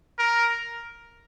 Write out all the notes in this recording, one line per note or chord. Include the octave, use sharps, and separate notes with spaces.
A#4